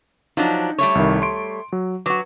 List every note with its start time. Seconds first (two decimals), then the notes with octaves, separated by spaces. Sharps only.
0.37 F3 F#3 D4 D#4
0.78 G3 A3 C#5
0.95 C2 D#3
1.22 C6 D7
1.73 F#3
2.06 F#3 F#4 B4 D6